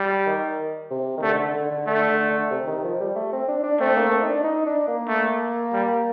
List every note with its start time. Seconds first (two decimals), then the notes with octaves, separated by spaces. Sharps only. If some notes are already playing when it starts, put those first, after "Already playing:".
Already playing: G3
0.27 D#3
0.90 C3
1.17 D#3
1.22 D3 A3
1.39 D3
1.55 D3
1.71 D3
1.87 D3 A3
2.09 D3
2.30 D3
2.51 C3
2.67 D#3
2.83 F3
3.00 G3
3.15 A3
3.32 C4
3.48 D4
3.63 D4
3.80 A3 C4
3.96 A#3
4.12 C4
4.23 D#4
4.29 D4
4.44 D#4
4.66 D4
4.88 A#3
5.08 A3
5.73 G3